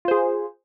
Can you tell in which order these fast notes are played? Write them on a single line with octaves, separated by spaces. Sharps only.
F4 C5 G#4